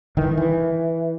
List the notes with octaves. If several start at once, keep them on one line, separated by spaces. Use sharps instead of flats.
G1 D#3 E3
E3